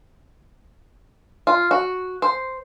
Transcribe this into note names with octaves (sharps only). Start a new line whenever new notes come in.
F4
F#4
C5